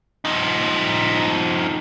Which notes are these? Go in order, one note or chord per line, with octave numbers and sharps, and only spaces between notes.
F3 D#4